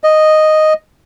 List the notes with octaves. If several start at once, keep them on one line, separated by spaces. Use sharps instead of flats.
D#5